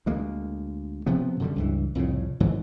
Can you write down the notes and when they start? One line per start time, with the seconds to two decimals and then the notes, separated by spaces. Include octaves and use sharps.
0.06 D2 G#3 A#3
1.06 C3 F3 B3
1.40 F#2 D3 G3
1.56 C#2 G2 E3
1.95 C2 F2 A2 C#3
2.40 G#1 G#2 E3 F#3